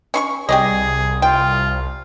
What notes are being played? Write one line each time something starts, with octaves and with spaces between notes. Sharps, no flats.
C#4 C6 C#6
C2 G4 G#4 D5 D#5
F4 G5